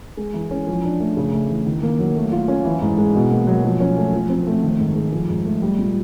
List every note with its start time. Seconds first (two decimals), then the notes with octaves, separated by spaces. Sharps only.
0.17 G#3
0.34 E3
0.51 C#4
0.67 F3
0.84 D4
1.00 A3
1.17 C#3
1.33 A3
1.50 E3
1.66 D#3
1.83 A#3
1.99 F#3
2.15 A3
2.32 F4
2.48 C#4
2.65 E3
2.82 G#2
2.98 G#3
3.15 B2
3.31 A#3
3.47 F#3
3.64 F3
3.80 C#4
3.97 A3
4.13 F3
4.29 C4
4.47 A3
4.63 D#3
4.79 G#2
4.96 G#3
5.12 F3
5.29 G#2
5.45 A3
5.62 G3
5.78 A#2